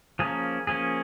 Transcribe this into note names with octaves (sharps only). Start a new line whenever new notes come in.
F3 A#3 C#4 G#4
F3 A#3 C#4 G#4